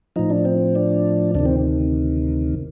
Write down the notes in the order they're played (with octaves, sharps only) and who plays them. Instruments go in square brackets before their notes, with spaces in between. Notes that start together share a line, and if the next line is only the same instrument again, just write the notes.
[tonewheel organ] A2 F3 D#4
D4
C4
D4
D2 C3 D#3 D4
C4